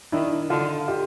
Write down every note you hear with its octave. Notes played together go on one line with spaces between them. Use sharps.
D#3 D4 E4
D3 D#4 F4
F4 G4